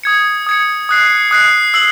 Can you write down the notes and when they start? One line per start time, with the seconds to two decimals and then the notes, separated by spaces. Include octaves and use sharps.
0.03 D#6 G#6 C#7
0.46 D#6 G#6 C#7
0.89 D#6 F#6 C7
1.31 D#6 F#6 C7
1.74 E6 C7 F#7